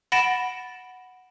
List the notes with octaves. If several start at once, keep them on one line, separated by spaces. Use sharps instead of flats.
F#5 B5 A6 A#6 D7 E7